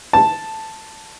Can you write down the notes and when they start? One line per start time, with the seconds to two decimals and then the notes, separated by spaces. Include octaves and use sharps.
0.13 A5